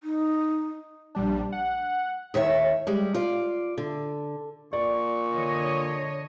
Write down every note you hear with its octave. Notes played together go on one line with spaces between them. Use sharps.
D#4
A#1 G3 D4
F#5
D#2 D#3 C#5 E5
G3 G#3
F4 D5
D3
A#2 D5 C#6
D3 C#5 D#5